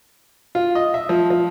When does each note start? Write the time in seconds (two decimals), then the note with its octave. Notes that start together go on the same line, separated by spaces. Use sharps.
0.55 F4
0.75 D#5
0.94 E5
1.09 F3
1.30 F3